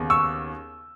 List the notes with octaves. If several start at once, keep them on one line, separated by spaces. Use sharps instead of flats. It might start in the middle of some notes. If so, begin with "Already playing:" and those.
Already playing: D#2 C#3 B3
C#6 E6